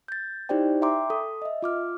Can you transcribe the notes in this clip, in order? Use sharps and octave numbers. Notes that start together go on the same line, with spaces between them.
G6 A6
D#4 E4 G4 C5 D5 G5
E5 G5 A#5 C6 D6
A4 D#6
D#5 E5
F4 D6 F6